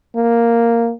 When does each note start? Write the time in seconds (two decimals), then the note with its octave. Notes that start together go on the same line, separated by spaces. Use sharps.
0.16 A#3